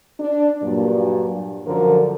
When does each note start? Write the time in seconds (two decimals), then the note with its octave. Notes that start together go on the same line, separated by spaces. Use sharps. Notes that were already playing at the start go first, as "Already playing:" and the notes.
0.19 D4
0.62 G2 A#2 F#3
1.66 F#2 D3 F3 A#4